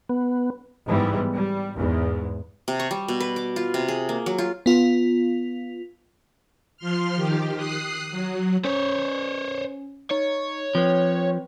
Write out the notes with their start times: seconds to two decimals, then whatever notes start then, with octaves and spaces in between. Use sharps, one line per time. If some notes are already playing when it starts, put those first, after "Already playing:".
0.09 B3
0.87 G#2 E3 G3 B3
1.33 G3
1.76 E2 G#2
2.68 C3
2.80 C#6
2.91 G3
3.08 B2
3.20 B4
3.36 D6
3.56 F4
3.74 C3
3.88 G#4
4.09 A#3
4.26 F#3
4.38 F4
4.66 B3 F4
6.77 F3 C6 F6
7.15 D#3 G4
7.55 D#6 F#6 C7
8.11 F#3
8.64 C#4 C5 C#5
10.11 D#4 C#5
10.75 F3 C4 B4